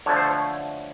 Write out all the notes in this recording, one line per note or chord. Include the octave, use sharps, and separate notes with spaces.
D3 F3 A3 C#5
C5
C#5